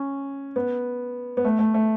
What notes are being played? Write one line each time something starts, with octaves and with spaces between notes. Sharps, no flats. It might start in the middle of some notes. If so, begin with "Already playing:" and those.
Already playing: C#4
B3
B3
A3
A3
A3